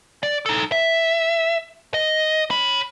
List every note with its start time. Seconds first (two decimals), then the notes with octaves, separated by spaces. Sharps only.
0.23 D5
0.46 D#4 A4
0.72 E5
1.94 D#5
2.50 C#5 B5